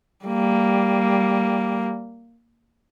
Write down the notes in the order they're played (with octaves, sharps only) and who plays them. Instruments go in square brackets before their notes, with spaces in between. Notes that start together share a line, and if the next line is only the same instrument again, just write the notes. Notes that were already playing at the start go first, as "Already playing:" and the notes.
[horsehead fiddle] G3 A#3